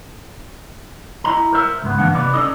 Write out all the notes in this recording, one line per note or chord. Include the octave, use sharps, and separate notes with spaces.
E4 D#5 A#5
A#4 C5 E5
C#2 G#2 B3
G2 E3 A#3 D4 F#5
C3 D#4 B4 D5
C#4 D#4 A4 D5 D#5